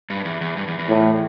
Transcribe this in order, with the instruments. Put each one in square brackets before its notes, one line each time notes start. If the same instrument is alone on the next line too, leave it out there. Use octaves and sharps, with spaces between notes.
[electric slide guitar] G2
E2
E2
G2
E2
E2
[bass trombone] A2